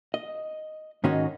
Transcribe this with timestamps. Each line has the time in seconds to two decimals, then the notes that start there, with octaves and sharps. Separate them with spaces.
0.14 D#5
1.04 G#2 D#3 C#4 D#4 F#4